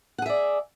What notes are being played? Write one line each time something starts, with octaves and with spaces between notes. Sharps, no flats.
G#4 D5 E5 F#5